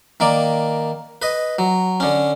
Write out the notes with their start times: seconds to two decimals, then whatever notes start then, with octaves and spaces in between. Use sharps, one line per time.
0.20 D#3 A#3 D5
1.22 B4 D#5
1.59 F#3
2.00 D3 C#4